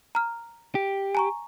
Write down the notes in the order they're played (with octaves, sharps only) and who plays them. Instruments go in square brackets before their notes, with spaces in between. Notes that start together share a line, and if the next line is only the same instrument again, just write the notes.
[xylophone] A#5 F6
[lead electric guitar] G4
[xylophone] G#5 A#5 C#6